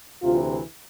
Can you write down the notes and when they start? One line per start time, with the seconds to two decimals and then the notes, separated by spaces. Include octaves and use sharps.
0.23 D2 C3 E3 F4